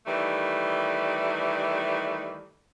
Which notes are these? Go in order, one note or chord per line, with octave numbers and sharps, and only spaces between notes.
D#3 E3 G3 A3